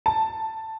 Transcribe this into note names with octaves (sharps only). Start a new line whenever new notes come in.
A5